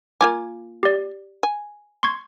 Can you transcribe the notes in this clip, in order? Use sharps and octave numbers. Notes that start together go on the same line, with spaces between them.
A#3 F4 G#5 D6 G#6
G4 D5
G#5
C6 C#6 G#6